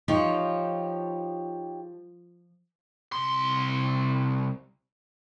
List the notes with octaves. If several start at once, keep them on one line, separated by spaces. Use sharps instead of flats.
F3 D#4 G4 C#5
C2 C6